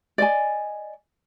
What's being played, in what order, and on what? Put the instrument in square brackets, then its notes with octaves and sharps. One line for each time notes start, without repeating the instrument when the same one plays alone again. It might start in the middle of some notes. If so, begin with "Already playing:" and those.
[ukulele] D5 D#5 G#5